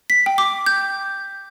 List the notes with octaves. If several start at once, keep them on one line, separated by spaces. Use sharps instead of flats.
B6
G5
D6
G6